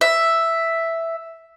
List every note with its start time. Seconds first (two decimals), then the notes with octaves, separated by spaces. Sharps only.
0.01 E5